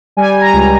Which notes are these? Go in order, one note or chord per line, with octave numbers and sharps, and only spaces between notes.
G3 G#5
A#5
C#2